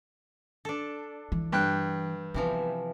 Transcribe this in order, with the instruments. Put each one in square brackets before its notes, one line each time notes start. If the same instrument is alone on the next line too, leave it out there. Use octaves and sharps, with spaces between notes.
[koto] D4 A4
[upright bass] E3
[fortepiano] G2 G5 F#6
[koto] C3 E3 F3 [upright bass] B3